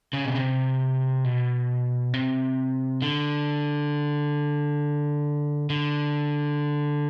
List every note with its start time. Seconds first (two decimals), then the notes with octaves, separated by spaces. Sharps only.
0.13 C#3
0.25 B2
0.36 C3
1.24 B2
2.14 C3
3.02 D3
5.70 D3